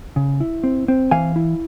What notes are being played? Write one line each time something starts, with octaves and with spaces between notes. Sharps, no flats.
C#3
E4
C4
C4
E3 F5 G#5
E4